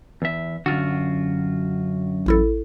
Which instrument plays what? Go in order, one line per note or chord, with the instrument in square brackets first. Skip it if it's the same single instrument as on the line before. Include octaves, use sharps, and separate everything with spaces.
[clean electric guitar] E2 E5
[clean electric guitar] F#2 F4 F#4 [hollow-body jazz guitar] D3
[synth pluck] A1 E4 A4